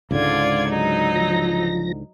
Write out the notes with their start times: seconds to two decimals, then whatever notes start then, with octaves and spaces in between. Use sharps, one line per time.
0.11 C#2 G#2 D3 F4 D5 G#6
0.68 F#3 D#4
1.15 F3 A#6